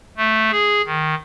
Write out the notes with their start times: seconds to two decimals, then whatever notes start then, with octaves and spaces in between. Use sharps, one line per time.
0.17 A3
0.51 G#4
0.86 D#3